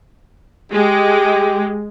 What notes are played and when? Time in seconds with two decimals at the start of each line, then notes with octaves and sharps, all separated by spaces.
0.72 G#3 G4